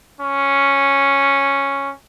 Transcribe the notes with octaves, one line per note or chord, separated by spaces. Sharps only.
C#4